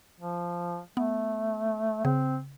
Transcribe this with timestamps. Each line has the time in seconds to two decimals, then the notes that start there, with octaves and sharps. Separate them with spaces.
0.20 F3
0.97 A3 B3
2.05 C#3 C4